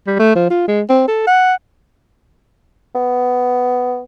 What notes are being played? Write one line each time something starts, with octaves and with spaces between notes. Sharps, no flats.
G3
A3
F3
F4
G#3
C4
A4
F#5
B3